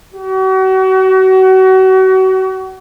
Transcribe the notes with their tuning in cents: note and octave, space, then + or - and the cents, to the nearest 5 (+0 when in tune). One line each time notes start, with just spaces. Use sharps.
F#4 +35